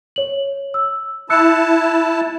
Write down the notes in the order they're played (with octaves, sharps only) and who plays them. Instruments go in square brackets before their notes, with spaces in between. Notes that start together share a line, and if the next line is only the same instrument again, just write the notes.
[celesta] C#5 F#7
E6
[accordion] E4 A5 [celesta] E6 F#6 C#7